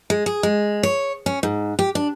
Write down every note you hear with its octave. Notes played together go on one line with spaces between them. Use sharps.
G#3
G#4
G#3
C#5
C#4
G#2
G4
D4